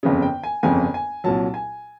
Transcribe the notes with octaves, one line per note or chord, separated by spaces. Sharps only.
G1 F2 C#3
G5
G#5
G1 F2 C#3 G#5
G#5
C2 A#2 F#3 A5
G#5